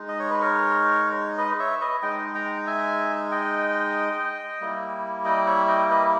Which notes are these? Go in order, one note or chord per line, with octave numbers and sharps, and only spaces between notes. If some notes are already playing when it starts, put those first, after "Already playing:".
Already playing: G#3 D#4
D#5
C#5
B4
A#4 C#5
B4 D#5
C#5 E5
B4 D#5
G#3 D#4 D#5 G5
G5 A#5
E5 G#5
D#5 G5
G3 A#3 E4
D#5 G5
C#5 E5
D#5 G5
B4 D#5